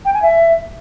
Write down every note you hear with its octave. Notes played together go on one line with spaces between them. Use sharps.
G5
G#5
E5